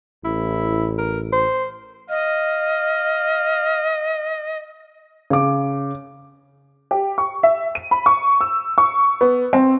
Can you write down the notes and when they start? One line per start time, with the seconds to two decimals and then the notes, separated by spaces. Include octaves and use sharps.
0.24 A1 E4
0.98 A#4
1.32 C5
2.09 D#5 F5
5.30 C#3 D6
6.91 G4
7.18 C#6
7.43 E5
7.75 D#7
7.91 B5
8.06 C#6
8.41 E6
8.78 C#6
9.21 B3
9.53 C4